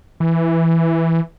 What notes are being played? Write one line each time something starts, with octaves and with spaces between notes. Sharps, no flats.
E3